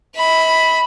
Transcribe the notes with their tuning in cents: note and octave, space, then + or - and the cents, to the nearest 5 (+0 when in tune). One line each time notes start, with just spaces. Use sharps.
E5 -45 B5 +0